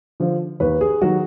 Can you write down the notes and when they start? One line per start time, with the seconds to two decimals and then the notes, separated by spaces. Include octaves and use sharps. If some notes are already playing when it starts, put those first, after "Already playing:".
0.20 D3 F3
0.60 D#2 B4
0.81 G#4
1.02 D#3 F#3 F#4